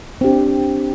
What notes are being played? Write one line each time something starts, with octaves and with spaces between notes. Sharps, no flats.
C4 D4 G4